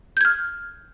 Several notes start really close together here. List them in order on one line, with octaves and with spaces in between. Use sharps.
G6 G#6 F6